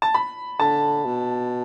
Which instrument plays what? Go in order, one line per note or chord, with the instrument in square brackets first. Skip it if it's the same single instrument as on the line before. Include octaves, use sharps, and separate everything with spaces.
[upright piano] A5
B5
[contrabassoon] D3 [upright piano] A5
[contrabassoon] B2